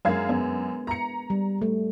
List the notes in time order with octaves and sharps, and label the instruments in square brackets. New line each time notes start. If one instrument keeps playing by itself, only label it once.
[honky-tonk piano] F#2 F5 G#6 [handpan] G#3 D4 A#4
[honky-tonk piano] F#2 [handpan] B3
[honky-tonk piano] A#5 C#7
[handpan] G3
A3